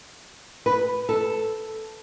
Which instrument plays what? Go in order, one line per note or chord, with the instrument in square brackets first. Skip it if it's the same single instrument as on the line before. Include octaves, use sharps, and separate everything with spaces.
[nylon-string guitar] B4
A4